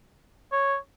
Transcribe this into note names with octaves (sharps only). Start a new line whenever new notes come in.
C#5